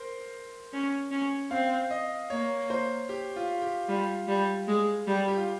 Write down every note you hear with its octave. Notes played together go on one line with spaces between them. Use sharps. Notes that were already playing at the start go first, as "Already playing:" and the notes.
Already playing: A#4 C5
C#4
C#4
C4 F5
D#5
A#3 C#5
C5
G4
F4
G4
G3 F4
G3
G#3
G3
G4
F4